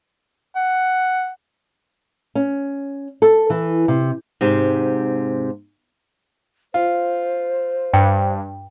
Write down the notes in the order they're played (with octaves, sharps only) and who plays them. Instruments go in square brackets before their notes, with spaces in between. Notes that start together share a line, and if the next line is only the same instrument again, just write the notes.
[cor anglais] F#5
[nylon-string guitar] C#4
A4
E3
C3
G#2 C3
[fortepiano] F4 [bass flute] C5
[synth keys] G2 [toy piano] G5